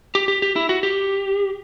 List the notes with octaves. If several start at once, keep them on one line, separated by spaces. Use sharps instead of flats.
G4
G4
G4
E4
F#4
G4